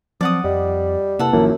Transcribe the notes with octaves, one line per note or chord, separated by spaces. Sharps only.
F3 F#3 C4 D5 F#5 D#6
F2 G3 D#5
C3 A#3 E4 A4 B4 F#5
A1 F#2 D#3 F3 A#3 E4 F4